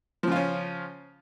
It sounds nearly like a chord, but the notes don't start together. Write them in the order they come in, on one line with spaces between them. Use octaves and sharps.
F3 C#3 F4 C#4